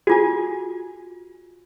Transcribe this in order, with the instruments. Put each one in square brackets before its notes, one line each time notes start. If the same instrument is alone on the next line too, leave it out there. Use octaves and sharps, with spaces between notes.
[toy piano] F4 F#4 [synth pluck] G#4 G#5